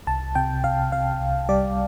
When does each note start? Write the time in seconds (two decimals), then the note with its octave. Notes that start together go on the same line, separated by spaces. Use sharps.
0.07 C2 A5
0.35 C3 G5
0.64 C3 F5
0.92 C3 F5
1.21 C2
1.49 G3 D5